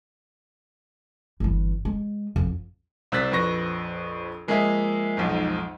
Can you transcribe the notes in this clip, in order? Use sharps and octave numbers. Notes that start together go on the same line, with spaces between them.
G1 E3
G#3
A1 F2
C2 C4 E6 F#6 A6 B6
A#1 F2 B4 C#6 A#6
F3 G#3 A#3 G#4 D#5 E5
B1 F2 G#2